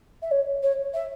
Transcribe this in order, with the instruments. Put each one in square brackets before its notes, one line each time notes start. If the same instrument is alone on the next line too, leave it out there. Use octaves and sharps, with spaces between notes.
[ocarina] E5
C#5
C#5
E5